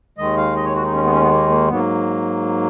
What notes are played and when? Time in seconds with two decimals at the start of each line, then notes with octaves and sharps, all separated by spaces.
0.18 D#2 D#3 G#3 D#5
0.37 F5
0.56 D#5
0.65 C#5
0.74 F#4
0.84 D#4
0.93 C#4
1.03 B3
1.12 C#4
1.21 B3
1.31 A#3
1.50 A#3
1.68 G#2 F#3 A#3 B3